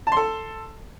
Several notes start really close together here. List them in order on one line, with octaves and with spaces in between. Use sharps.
A5 C6 A4